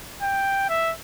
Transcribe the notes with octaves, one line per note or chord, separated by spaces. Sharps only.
G5
E5